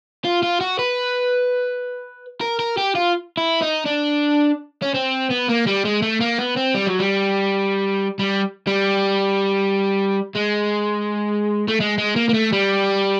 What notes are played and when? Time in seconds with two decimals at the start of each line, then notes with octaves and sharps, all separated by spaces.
0.25 F4
0.43 F4
0.61 F#4
0.79 B4
2.41 A#4
2.59 A#4
2.78 G4
2.95 F4
3.37 E4
3.62 D#4
3.85 D4
4.82 C#4
4.94 C4
5.30 B3
5.48 A#3
5.66 G3
5.85 G#3
6.02 A3
6.20 A#3
6.38 B3
6.56 C4
6.74 G3
6.87 F#3
7.00 G3
8.19 G3
8.67 G3
10.36 G#3
11.68 A3
11.80 G#3
11.98 G#3
12.16 A#3
12.29 A#3
12.34 A3
12.53 G3